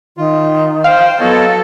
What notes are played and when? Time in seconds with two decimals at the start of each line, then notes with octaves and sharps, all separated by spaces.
0.17 D#3 F4
0.84 C5 F5 G5
1.20 F#3 B3 A4 C#5 D#5